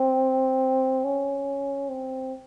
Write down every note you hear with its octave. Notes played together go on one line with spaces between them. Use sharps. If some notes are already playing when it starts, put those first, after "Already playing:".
Already playing: C4
C#4
C4